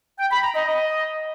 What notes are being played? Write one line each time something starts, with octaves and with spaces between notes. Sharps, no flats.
G5
B5
A#5
D#5
D#5